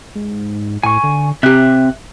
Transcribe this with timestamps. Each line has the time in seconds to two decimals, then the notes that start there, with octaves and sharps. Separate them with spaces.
0.15 G#2
0.83 A2 G#5 C#6
1.04 D3
1.43 C3 C4 G4 E5 F#6